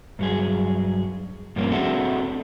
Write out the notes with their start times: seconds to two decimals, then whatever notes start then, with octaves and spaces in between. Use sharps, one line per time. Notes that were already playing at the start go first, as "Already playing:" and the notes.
0.19 G2 F#3 G#4
1.56 G2 F3 A#3 C4 C#4
1.71 A3 C4 D4 F#4 G#4 A4